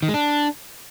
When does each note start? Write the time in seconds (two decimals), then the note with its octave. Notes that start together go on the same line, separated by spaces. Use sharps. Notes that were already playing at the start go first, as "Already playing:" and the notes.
0.02 D#3
0.08 G#3
0.14 D4